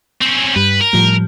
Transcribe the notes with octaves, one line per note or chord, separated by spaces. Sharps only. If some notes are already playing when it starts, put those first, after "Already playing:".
C4 C#4
G2 G3 B4
A#4
A2 F3 G3